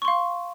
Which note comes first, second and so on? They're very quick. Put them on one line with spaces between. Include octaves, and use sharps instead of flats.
C#6 C6 F5